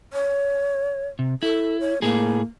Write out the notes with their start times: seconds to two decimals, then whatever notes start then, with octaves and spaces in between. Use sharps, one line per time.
0.13 C#5
1.19 C3
1.43 E4 A4
1.80 C#5
2.02 A2 A#3 G#4